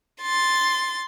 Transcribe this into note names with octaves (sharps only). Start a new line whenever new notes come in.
C6 A6